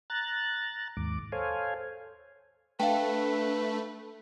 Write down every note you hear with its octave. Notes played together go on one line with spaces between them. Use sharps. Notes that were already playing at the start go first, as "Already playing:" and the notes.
A#5 F#6 A6
D#2 G#2 D6
A4 C5 C#5 F5 G#5
A3 D4 B4 F5 G5